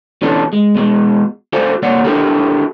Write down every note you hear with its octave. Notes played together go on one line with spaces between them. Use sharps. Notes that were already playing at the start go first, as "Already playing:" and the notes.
B2 E3 C#4 D4 A4
G#3
B2 G#3
F#4 A4 C5 D5 F5 G#5
C2 A#3 C#5 D5 F#5
D4 E4 F#4 G4 A4 A#4